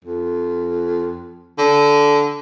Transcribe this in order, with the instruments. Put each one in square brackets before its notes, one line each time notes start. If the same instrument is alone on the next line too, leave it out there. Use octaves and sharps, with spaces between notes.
[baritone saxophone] F2
D3